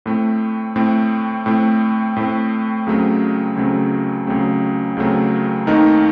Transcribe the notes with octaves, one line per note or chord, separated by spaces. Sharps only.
A2 A3 C4
A2 A3 C4
A2 A3 C4
A2 A3 C4
C#2 C#3 F#3 A3 C4
C#2 C#3 F#3 A3 C4
C#2 C#3 F#3 A3 C4
C#2 C#3 F#3 A3 C4
D#2 D#3 A3 C4 D#4